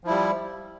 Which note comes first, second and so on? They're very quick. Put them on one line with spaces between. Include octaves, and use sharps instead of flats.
F3 E4 G3